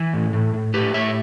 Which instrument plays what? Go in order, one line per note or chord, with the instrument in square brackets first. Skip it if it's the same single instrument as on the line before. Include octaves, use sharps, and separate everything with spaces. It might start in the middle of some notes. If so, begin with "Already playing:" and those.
Already playing: [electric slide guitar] E3
A2
A2
A2
A2 G4 B4
A2 C#5 E5